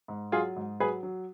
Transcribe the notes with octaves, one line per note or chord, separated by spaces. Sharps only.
G#2
F#3 F4 G#4
G#2
F#3 G#4 B4
F#3